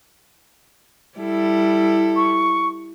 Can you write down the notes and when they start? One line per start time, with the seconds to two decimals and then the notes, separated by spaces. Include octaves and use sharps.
1.18 G3 E4 A4
2.16 C#6